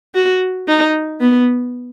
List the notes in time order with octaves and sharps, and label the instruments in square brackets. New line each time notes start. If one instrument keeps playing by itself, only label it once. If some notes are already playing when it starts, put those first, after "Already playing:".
[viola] F#4
D#4
B3